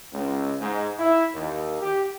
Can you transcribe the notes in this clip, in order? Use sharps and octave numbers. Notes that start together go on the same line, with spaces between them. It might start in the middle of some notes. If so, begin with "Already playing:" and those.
C#2
G#2
E4
D#2
G4